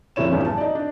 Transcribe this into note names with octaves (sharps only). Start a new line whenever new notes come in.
F1 C3 E4 C#5 E7
D#1 E2 G2 G3 C#4
A5
D#4 D5
D4